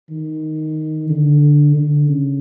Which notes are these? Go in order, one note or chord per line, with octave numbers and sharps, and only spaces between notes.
D#3
D3
D3
C#3